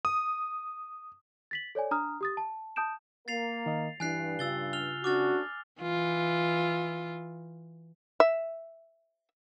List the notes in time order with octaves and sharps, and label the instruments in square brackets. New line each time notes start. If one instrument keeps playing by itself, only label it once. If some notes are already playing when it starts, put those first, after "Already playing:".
[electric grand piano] D#6
[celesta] A6 B6 F#7
A4 C#5 D5 G#5
D4 A#5 D#6 F6
G4 D#6 A6
A5
A5 D#6 G6 D7 E7
[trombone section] A#3 A#4 [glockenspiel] A6 C7 F7
[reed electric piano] D#3 D#5
[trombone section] G2 [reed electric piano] E3 D4 E4 [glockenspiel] G#5 F#6 C7
[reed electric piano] C#3 F4 [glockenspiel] E6 A6 G7
[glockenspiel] F6 F7 G7
[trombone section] D2 C#4 D4 [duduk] F#4 [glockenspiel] D6 F6 A6
[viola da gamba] E3 F4
[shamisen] E5